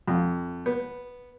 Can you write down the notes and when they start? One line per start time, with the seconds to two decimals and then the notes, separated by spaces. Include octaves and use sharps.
0.08 F2
0.66 B3